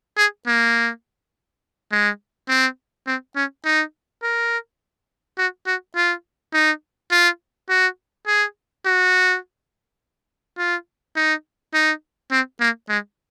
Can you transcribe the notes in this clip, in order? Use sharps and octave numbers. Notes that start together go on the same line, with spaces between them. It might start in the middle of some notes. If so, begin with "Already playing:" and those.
G#4
A#3
G#3
C4
C4
C#4
D#4
A#4
F#4
F#4
F4
D#4
F4
F#4
G#4
F#4
F4
D#4
D#4
C4
A#3
G#3